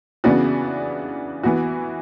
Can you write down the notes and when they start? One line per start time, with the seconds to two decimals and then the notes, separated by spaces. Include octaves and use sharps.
0.24 C#3 E3 B3 D4 F#4
1.43 E3 B3 F#4